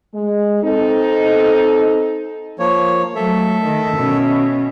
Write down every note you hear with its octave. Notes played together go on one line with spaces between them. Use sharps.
G#3
C4 D#4 A4
F3 A#3 C#5
F#3 A3 A4 E5
D#3
B2 C#4